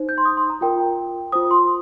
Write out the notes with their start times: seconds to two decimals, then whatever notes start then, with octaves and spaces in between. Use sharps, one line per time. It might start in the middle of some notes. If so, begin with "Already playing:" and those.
Already playing: D#4 C5
0.09 G6
0.18 C6
0.25 D#6
0.37 C6
0.50 A#5
0.61 F4 A#4 G5
1.32 F4 C5 D#6
1.51 C6